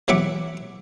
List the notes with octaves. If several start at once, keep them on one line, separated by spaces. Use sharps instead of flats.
E3 F#3 E5 F#5 D6